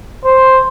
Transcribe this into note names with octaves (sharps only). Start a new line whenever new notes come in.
C5